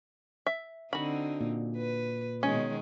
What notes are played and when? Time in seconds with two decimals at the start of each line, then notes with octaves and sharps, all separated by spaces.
0.46 E5
0.93 D3 C4 D#4 F#4 B5
1.40 A#2
1.77 B4
2.43 B2 D#3 G#3 C#4